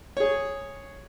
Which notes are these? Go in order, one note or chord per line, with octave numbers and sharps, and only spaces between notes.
G#4 C#5